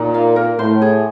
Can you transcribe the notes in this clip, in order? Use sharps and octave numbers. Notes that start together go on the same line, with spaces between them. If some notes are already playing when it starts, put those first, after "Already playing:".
Already playing: A#2 D#4
F5
A#4
A2 C5
G#4